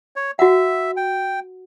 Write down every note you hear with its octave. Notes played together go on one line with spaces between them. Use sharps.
C#5
F#4 E5 F#5
G5